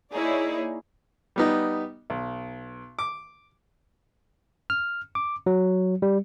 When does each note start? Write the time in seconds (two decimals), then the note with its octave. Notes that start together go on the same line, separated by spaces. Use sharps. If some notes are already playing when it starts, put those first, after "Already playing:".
0.14 A#3 D#4 E4 G#4 C#5 D5
1.36 G3 B3 D#4
2.10 B1
2.99 D6
4.70 F6
5.15 D6
5.46 F#3
6.02 G3